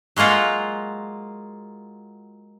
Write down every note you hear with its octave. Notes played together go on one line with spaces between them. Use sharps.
F#3 G#3 A#3 F4 F#5